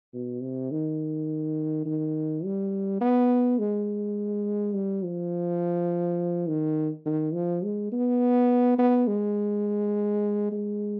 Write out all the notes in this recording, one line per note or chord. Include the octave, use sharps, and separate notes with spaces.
B2
C3
D#3
D#3
G3
B3
G#3
G3
F3
D#3
D#3
F3
G#3
B3
B3
G#3
G#3